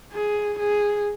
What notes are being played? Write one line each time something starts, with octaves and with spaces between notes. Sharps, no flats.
G#4
G#4